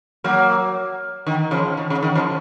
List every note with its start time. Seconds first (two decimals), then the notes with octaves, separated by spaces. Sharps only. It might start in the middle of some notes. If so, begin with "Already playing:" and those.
0.24 F#3 A#3
1.27 D#3
1.51 C#3 F3
1.77 D#3
1.90 C#3
2.03 D#3
2.15 C#3 F3